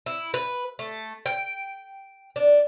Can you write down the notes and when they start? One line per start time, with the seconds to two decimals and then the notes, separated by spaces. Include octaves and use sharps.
0.06 E4
0.34 B4
0.79 A3
1.26 G5
2.36 D4